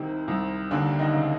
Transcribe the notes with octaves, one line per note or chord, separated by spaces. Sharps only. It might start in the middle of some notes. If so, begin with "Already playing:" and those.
Already playing: C2 C3 D#3
C2
D#2 D3 D4
D#3 D#4
C#3